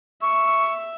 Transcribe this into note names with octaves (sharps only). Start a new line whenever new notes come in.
E5 C#6